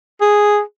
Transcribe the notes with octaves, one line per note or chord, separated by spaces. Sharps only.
G#4